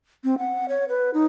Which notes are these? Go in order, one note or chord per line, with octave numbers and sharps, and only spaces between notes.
C4
F#5
C#5
B4
D#4